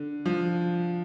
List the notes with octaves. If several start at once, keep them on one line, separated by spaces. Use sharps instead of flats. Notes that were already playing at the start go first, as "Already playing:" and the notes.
Already playing: D3
F3